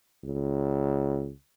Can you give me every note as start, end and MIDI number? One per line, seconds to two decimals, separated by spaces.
0.25 1.31 37